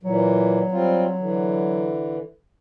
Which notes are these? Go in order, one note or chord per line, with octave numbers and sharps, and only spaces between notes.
A#2 E3 F#3
G3 C4 F4
D3 E3